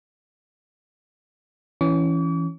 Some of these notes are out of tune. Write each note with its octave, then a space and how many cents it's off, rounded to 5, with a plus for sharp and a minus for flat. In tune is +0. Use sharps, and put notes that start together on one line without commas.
E3 +0 C#4 +0 D6 -45